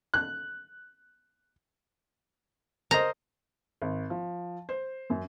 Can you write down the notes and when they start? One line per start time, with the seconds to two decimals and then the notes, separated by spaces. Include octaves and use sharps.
0.14 F#6
2.91 A#4 C5 D#5 A#5
3.82 G#1
4.10 F3
4.69 C5
5.10 F#2